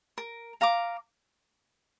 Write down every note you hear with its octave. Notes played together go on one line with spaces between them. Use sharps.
A#4
F5 A#5 D6